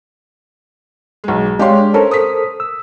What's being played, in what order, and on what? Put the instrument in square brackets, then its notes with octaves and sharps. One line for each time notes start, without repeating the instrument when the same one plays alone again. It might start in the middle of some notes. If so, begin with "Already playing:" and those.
[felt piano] B1 G#3
[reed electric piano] G#3 D4 C#5 [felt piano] G4 F5 C6
[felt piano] C#4 [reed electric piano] A4 A#4 C5
[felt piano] D#6 B6
[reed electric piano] E6